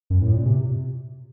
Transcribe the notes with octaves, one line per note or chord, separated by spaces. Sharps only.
F#2
A2
A#2
C3